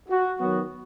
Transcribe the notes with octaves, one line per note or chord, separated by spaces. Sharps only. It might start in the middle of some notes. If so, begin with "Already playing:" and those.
F#4
D#3 F#3 B3 F#4